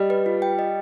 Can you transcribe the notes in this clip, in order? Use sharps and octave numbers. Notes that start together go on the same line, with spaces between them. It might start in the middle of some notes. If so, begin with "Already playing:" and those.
Already playing: G3 D#5
B4
F4
G5
D#5